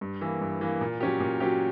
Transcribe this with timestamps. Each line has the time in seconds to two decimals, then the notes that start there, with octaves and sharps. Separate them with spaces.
0.01 G2
0.21 E3 A#3
0.41 G2
0.61 E3 A#3
0.81 A#2
1.01 F#3 C#4 G4
1.20 A#2
1.40 F#3 C#4 G4